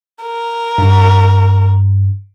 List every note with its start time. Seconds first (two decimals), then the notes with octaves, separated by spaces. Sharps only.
0.23 A#4
0.78 G2